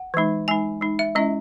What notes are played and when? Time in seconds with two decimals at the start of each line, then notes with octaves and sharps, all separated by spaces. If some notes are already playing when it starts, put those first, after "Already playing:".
Already playing: F#5
0.14 E3 G#3 D#4
0.48 G#3 D#4 G#5
0.81 G#3 D#4
0.99 E5
1.15 G#3 C#4 E4 D#5